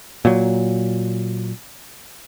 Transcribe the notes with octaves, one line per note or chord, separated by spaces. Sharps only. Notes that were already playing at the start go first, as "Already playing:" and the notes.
A#2 F#3